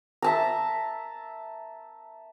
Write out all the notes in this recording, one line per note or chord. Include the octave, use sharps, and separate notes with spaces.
E5 A5 A#5